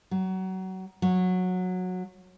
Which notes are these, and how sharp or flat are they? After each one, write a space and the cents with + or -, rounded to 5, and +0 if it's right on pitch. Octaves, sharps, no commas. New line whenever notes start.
F#3 +25
F#3 -15